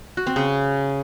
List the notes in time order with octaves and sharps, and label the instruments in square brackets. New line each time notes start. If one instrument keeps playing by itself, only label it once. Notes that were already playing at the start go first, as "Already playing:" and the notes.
[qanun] F#4
C4
C#3